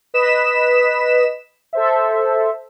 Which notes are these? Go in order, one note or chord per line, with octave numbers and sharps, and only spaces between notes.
B4 D#5 B6 E7
A4 C5 E5